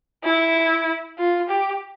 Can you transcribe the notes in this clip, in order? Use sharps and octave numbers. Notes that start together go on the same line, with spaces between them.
E4
F4
G4